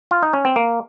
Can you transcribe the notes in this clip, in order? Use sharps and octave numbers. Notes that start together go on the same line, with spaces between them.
F4
D#4
C#4
C4
A#3